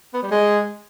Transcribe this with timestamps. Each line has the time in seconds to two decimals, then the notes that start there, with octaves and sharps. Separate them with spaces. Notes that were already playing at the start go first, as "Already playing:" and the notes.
0.14 B3
0.22 G3
0.31 G#3